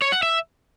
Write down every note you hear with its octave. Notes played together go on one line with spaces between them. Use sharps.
C#5
F#5
E5